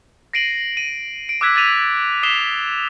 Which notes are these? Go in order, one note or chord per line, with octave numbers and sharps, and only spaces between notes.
A#6 C7 D7 D#7 F#7
D#7
D7
D6 E6 F#6 G#6 B6
G#6 A6 B6 D#7 F7
D#6 B6 C7 E7 F7 G7